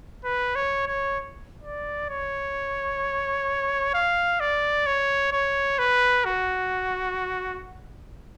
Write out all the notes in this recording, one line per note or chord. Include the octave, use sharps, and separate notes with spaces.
B4
C#5
C#5
D5
C#5
F5
D5
C#5
C#5
B4
F#4